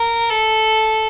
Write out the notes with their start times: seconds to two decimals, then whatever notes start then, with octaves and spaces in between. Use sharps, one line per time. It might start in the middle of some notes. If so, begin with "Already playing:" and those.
Already playing: A#4
0.30 A4